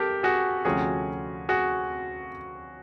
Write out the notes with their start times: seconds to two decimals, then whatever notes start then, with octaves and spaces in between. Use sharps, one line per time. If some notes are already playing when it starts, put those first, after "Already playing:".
Already playing: G4 A4 A#4
0.23 F#4 G#4
0.65 D2 C3 F3 A3 C#4 F#4 G#4
1.49 F#4 G#4